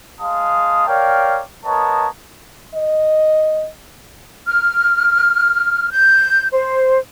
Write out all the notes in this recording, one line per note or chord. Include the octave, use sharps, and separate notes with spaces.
G#3 F5 A5 D#6
A#4 C#5 D5 F5 G5
B3 A#4 C#5 D#5 A5
D#5
F6
G6
C5